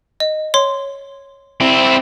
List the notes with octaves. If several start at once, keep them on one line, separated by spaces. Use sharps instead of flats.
D#5
C#5 C6
C4 E4